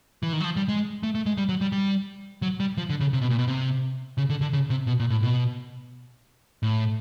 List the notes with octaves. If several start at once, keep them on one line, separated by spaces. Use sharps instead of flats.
E3
D#3
F#3
F3
G3
G#3
A3
A3
G#3
G3
F#3
G3
G3
F#3
G3
F3
D3
C#3
C3
B2
A#2
B2
C3
C#3
D3
D3
C#3
C3
B2
A#2
A2
B2
A2